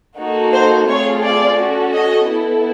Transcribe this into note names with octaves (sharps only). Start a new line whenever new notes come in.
A#3 D#4 F#4 A4
C5
A3 C4 F4 G#4 C#5
D5
C#4 F#4 A4
D#5
B3 E4 A4